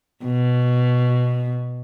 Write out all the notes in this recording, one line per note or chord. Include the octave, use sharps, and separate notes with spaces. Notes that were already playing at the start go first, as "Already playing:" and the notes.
B2